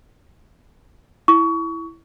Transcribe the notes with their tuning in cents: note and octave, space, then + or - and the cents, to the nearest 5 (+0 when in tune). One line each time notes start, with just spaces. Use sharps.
E4 +0 C#6 +25